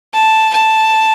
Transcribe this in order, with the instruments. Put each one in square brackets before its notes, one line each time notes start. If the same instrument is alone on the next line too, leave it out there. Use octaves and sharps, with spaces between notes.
[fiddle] A5
A5